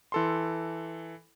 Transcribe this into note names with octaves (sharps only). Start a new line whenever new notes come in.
E3 A4 C6